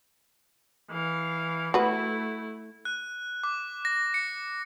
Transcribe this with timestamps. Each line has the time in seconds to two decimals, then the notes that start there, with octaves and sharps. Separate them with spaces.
0.91 E3 F5
1.74 A3 E4 F#4 B4
2.85 F#6
3.44 D6
3.85 A#6
4.14 C#7